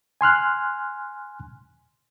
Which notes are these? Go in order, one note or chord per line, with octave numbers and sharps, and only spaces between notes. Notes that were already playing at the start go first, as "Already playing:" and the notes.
G#5 C6 F6 F#6